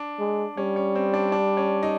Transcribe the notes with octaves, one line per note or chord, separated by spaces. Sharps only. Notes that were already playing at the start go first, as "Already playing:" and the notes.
Already playing: D4
G#3
G3 C#4
C#4
C4
D4
D4
C#4
D#4